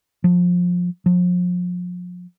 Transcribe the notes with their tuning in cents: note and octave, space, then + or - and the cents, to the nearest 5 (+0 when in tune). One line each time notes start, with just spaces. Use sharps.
F3 +25
F3 +40